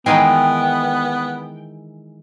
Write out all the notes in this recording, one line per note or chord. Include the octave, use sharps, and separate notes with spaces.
D#3 E3 G#3 B3 G5